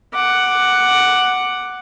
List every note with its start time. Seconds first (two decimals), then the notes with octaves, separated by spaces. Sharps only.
0.15 F#5 D6